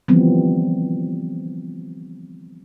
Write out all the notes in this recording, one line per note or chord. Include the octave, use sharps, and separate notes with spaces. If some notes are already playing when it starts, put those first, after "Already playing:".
D3 E3 F3 G3 B3 C4